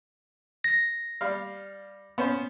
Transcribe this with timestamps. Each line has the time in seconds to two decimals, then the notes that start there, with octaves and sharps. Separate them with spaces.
0.64 A#6
1.21 G3 F5
2.18 B3 C#4 C5